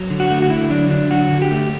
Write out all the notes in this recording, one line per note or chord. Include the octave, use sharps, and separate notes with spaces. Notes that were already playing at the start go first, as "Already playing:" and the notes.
Already playing: F#3
D3
F#4
A3
F#4
D3 E4
F#3 D4
D3 D4
F#3 F#4
D3
G4
A3